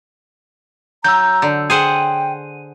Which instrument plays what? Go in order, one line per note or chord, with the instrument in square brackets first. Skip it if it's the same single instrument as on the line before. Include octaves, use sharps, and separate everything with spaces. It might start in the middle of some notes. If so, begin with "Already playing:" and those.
[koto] F#3 [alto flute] A#5 [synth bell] E6 G6
[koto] D3
[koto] G#4 C5 F#5 [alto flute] G5 [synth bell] D#7